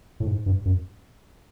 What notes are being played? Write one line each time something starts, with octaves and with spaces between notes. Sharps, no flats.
A2
G#2
G2
F#2